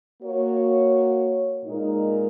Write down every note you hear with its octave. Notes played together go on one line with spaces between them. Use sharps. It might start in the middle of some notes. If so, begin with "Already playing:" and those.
A#3 F#4 C#5
A#2 G#3 D#4 A#4